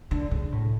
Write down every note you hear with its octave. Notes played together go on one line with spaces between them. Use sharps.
D3
C#3
A2